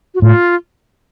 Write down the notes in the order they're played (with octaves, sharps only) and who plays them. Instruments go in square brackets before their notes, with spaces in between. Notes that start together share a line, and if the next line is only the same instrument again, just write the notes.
[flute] F#4
[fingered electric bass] A2 [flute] F4